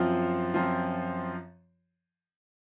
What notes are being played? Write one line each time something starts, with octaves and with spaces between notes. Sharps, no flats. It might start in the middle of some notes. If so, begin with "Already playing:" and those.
Already playing: F#2 F3 C4 F4
F#2 F3 C4 F4